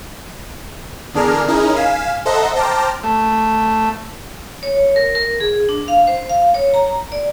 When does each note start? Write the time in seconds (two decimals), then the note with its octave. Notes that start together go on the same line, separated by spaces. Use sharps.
1.14 E2 D3 D4 G#4 A#4 F6
1.47 C#4 D#4 E4 G#4 A#4
1.76 F5 G#5 B6 E7
2.25 A4 C5 D#5 E5 F#5 A#5
2.55 C5 G5 A5 A#5 D6 F6
3.03 A3
4.63 C#5
4.96 A#4
5.15 A#4
5.40 G#4
5.69 D4
5.88 F5
6.07 C5
6.29 F5
6.54 C#5
6.74 A#5
7.12 D5